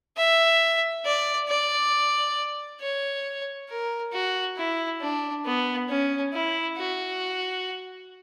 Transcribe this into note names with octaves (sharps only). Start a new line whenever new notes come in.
E5
D5
D5
C#5
A#4
F#4
E4
D4
B3
C#4
E4
F#4